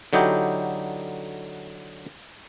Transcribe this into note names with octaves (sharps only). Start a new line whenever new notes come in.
D3 F#3 D#4 E4 G4